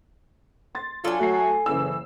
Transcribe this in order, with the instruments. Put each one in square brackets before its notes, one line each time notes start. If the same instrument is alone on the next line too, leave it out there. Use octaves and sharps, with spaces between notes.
[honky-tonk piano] C6 A6
[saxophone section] F#3 D4 F4 [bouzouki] A4 G#5
[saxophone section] F#3 F#4 [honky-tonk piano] A3 C7
[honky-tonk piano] F#1 C#3 E6 [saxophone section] E3